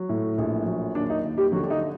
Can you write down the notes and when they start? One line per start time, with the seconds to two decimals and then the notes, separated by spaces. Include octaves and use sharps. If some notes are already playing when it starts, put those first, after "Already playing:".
Already playing: F#3
0.09 A2
0.38 A#1
0.66 F#3
0.94 D#2 D4
1.10 D#4
1.24 D#2
1.38 G3 G4
1.52 D3 F#3 F#4
1.63 D4
1.70 D#4